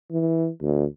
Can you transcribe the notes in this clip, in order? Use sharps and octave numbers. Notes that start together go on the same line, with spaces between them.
E3
D2